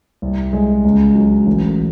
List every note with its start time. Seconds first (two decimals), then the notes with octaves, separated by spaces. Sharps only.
0.22 C2
0.53 G#3
0.85 C#2
1.15 F#3
1.47 A1